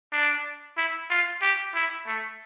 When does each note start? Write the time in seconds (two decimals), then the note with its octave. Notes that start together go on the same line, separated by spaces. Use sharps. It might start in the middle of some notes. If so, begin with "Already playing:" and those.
0.12 D4
0.77 E4
1.10 F4
1.42 G4
1.75 E4
2.07 A3